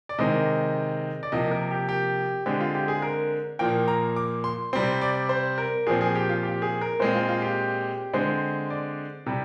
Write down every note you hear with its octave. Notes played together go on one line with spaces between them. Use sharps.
D5
C3 D#3 G#3 C4 D#5
D5
C3 F3 A#3 D#5
A#4
G4
G4
D3 G#3 C4 G4
F4
G4
G#4
A#4
A#2 F3 A#3 G5
A#5
D6
C6
C3 G3 C4 C6
D5
C5
A#4
A#2 F3 C4 G#4
G#4
G4
F4
G4
G#4
A#4
A#2 G#3 C4 C5
F4
F4
G4
D3 G#3 C4 C5
D5
C3 G3